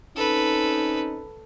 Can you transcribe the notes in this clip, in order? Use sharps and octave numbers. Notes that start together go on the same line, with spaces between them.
C4 C#4 D#4 A4 B4